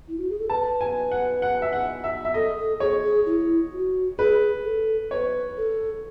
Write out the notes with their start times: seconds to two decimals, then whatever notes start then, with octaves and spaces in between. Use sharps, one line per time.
0.08 E4
0.18 F#4
0.29 G#4
0.39 A4
0.49 B4 A5
0.81 G#5
1.11 F#5
1.42 F#5
1.62 E5
1.73 F#5
2.04 E5
2.25 E5
2.34 A4 D#5
2.58 A4
2.80 G#4 C#5
3.04 G#4
3.26 E4
3.73 F#4
4.18 G#4 B4
4.64 A4
5.11 B4 C#5
5.57 A4